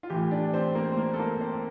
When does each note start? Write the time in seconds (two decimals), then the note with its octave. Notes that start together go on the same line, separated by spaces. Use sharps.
0.03 F4
0.10 A2 E3 G4
0.31 D4 D5
0.53 C4 C5
0.75 A#3 A#4
0.91 C5
0.97 A#3 A#4
1.13 A4
1.19 A#3 A#4
1.40 C4 C5